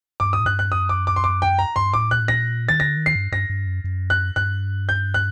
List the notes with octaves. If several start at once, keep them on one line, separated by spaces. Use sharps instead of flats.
G2 D6
D#6
A2
G2 F#6
F#6
F#2 D#6
D6
D6
C6
D6
G5
A#5
G2 C6
A2 D6
A#2 F#6
A2
A#2 A#6
D#3 A6
D3 A#6
D#3
C7
G2
G2 A#6
G2
F#2
F#2
F#6
G2 F#6
G6
F#6